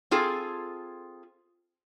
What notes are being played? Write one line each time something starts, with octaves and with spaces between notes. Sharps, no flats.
C4 F4 G#4 A4